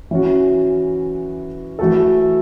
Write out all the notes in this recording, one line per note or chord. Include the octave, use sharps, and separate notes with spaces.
E3 C#4 F#4
E3 A3 F#4 A4